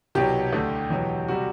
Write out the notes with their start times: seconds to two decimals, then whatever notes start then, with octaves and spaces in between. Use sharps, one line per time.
0.15 C2 B2 F#3 G4
0.53 D2 D3 A3
0.90 E2 B2 F#3
1.28 C3 G3 F#4